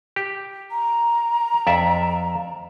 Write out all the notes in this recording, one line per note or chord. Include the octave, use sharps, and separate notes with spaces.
G4
A#5
F2 D5 E5